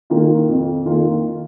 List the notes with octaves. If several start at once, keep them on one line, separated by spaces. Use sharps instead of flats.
D#3 A#3 F4
F2
D#3 A#3 F4